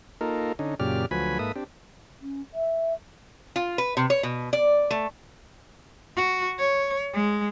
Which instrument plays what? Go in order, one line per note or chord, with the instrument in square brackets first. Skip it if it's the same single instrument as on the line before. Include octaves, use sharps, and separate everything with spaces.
[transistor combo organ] A#3 D#4 F4 A4 A#4
D3 C#4 D#4
F#2 A#2 C#3 G4 D5 F6
D2 F3 F#3 B4 G#5 B5
G#2 A#3 A4 B4 E5 D#6
C4 D4 G4
[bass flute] C#4
E5
[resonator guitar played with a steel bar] F4
B4
C3
C#5
B2
D5
A3
[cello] F#4
C#5
G#3